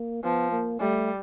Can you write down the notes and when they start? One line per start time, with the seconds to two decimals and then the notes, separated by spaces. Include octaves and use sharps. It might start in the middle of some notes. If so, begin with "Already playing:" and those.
Already playing: A#3
0.24 F3 B3
0.52 A#3
0.80 G3 A3